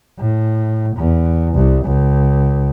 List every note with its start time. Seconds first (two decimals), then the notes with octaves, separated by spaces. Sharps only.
0.19 A2
0.96 E2
1.54 C2
1.85 C#2